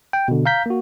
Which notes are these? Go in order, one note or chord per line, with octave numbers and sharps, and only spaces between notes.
G5
B2 D3
F5 A#5 G6 B6
A#3 F#4